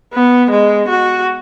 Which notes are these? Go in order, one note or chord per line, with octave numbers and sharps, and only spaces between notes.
B3
G#3
F#4